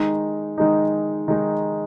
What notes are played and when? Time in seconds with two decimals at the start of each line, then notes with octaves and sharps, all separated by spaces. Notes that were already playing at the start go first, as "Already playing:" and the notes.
Already playing: D#3 G#3 D#4
0.58 D#3 G#3 D#4
1.28 D#3 G#3 D#4